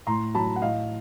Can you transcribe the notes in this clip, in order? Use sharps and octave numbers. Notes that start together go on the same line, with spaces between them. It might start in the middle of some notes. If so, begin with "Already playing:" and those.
A2 A#5 C6
F#3 A5 B5
F#5
A2 D#5 F5